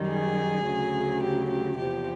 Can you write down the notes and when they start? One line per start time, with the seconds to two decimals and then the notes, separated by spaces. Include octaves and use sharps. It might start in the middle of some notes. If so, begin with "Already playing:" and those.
Already playing: F#2 D#3 G3
0.09 G#4
0.66 D2 C#3 F#3
1.22 G4
1.49 G4
1.77 E2 C3 F3 G4